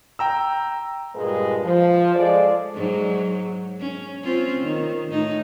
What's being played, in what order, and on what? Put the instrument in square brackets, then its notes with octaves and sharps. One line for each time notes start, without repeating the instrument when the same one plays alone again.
[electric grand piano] G5 A#5 E6
[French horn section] G2 A#2 G#3 G#4 B4
F3
G#3 A4 D5
[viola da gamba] G#2 F#3
C#4
C4 C#4 F4
D#3
A2 D#4